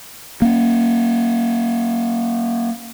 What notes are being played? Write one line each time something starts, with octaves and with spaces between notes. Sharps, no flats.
A#3 C#4